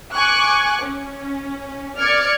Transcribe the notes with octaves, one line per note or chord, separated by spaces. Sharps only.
G#5 C#6 D6 F#6
C#4
D5 F6 G#6 C#7